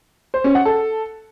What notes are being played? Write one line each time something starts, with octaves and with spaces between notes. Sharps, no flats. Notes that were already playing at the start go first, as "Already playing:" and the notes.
C5
C#4
F#5
A4